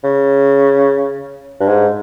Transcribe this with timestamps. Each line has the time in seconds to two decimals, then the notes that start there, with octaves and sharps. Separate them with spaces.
0.03 C#3
1.60 G2
1.68 G#2